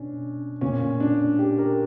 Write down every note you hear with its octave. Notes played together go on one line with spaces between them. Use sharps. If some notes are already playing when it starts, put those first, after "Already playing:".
Already playing: B2 C#4 D4
A#2 C#4
D4
G4
A#4